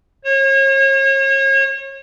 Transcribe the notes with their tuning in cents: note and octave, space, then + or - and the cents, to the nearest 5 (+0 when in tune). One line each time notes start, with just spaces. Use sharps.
C#5 -35